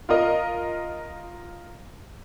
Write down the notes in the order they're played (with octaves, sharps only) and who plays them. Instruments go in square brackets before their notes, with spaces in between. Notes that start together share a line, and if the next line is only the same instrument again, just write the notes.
[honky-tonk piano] F4 A#4 D#5